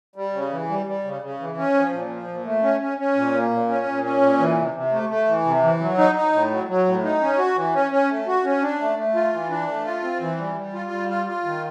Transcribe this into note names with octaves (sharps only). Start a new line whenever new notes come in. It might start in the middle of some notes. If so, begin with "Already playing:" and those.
G3
C#3
E3
G3
G3
C#3
C#3
E3
C#4
F3
A#2
F3
A#2
A3
C#4
C#4
C#4
A#2
A#3
A#2
C#4
A#2
C#4
A#2
E3
C3
C3
A3
A3
E3
C3
E3
F#3
D#4
D#4
A2
F#3
F#3
A2
D#4
C#4
F#4
E3
C#4
C#4
A3
F#4
C#4
D4
A3
A3
F4
E3
D4
A3
F4
C4
E3
G3
G3
F4
G3
F4
F4
D#3